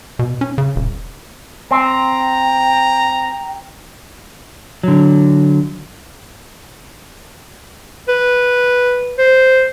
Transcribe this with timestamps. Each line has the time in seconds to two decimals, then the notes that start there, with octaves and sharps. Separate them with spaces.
0.19 B2
0.41 C#4
0.58 C#3
0.76 D#1
1.71 C4 G5 A#5
4.83 D3 F#3
8.09 B4
9.19 C5